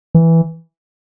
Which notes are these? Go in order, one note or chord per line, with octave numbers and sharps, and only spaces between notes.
E3